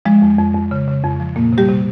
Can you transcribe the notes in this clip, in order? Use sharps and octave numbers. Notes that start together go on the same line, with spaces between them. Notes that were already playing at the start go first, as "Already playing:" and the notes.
F3 G#3
F2
F2
F2
C#3
C#3
F2
F3
F2 A#2 A#3
C3
G3 G4
C3